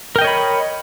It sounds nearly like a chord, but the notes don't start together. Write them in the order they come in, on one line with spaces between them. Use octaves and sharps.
A#4 G5 D#5 C#5 B5